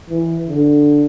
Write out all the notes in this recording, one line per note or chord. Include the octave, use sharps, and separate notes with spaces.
E3
D3